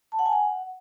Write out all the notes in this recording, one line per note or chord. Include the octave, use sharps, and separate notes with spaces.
A5
F#5
G#5
F#5